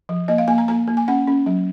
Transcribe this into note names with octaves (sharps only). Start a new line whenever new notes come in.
F3
A#3 D#5
F5
A#3 G#5
A#5
A#3 A#5
A#3
G#5
C#4 F#5
C#4
F#3